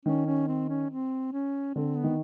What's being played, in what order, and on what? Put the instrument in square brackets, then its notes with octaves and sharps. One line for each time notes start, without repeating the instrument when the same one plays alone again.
[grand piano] D#3 [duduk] C#4
[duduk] C#4
C4
C#4
C4
C#4
[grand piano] D3 [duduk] C4
[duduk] B3
[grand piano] D#3